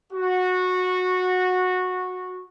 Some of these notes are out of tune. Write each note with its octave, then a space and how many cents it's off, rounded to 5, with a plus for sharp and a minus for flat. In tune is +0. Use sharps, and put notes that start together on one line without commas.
F#4 -15